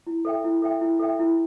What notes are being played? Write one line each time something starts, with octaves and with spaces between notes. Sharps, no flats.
E4
A4 E5 G5
E4
A4 E5 G5
E4
A4 E5 G5
E4